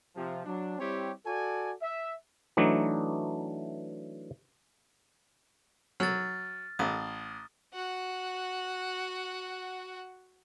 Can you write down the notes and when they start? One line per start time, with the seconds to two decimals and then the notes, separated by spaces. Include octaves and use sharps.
0.16 C3 F3
0.45 F#3 D4
0.79 G3 C4 E4 G4 C#5
1.26 F#4 A4 D5 G#5
1.81 E5
2.57 E3 F#3 A3 D4 D#4
6.00 F#3 F6 A6
6.79 A1 D#6
7.74 F#4 F#5